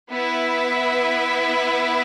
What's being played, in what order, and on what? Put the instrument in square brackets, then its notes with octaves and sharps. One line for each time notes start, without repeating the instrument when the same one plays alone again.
[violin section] B3 E4 B4 E5